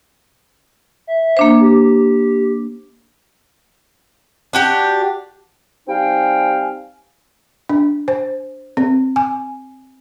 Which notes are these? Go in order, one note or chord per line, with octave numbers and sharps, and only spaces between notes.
E5
A#3 D4 C5
G4
D4 F#4 G4
G3 C4 D#4 F5 G5 G#5
D4
C5
C4
G#5